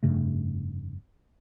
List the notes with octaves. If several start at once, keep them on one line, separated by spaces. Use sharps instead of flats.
F1 G2 C#3 A3